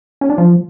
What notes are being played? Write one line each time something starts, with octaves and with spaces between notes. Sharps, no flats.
C#4
D4
F3